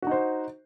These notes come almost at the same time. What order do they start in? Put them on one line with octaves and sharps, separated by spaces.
F#4 D#4 C5